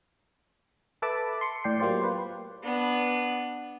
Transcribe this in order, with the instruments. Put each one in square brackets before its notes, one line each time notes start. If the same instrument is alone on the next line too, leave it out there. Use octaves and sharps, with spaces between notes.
[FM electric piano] A4 B4 E5 A5 B5 D6
C6 C#7
A2 D5 G5 C7
F#3 A#3 F4 G4 C5 D5
A#3 B4 C5
[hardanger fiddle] B3 D4